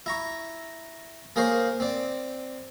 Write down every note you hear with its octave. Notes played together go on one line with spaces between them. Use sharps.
E4 A#5 C#6
A#3 G#4 A#4 C5 C#5
C4 D5